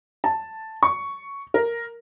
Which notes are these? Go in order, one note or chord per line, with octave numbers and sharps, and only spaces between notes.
A5
C#6
A#4